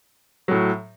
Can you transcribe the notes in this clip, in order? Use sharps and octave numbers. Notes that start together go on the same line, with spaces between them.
A2 F#3